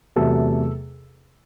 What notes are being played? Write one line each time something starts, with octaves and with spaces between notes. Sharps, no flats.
E2 C3 F#3 A3 A4